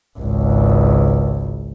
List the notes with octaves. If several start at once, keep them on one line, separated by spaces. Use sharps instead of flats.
G#1 C#2